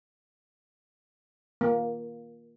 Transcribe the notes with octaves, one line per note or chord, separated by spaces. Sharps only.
A#3